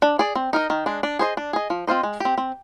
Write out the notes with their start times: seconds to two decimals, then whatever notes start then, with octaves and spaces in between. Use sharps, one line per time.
0.02 D4
0.19 G#4 D5
0.35 C4
0.53 D#4 A#4 D#5
0.70 D#3
0.86 G#3 D4
1.03 D4
1.19 G#4 C5 D#5
1.37 D4
1.53 G#4 D#5
1.70 F3
1.87 C4 F4 C5 D#5
2.03 G#3
2.20 C4 G4
2.38 C4